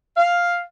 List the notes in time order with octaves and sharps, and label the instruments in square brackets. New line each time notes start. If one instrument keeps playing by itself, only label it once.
[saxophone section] F5